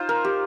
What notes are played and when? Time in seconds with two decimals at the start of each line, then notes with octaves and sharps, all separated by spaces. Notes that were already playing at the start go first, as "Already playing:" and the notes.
Already playing: D#4 F4 C5
0.09 A#4
0.25 G4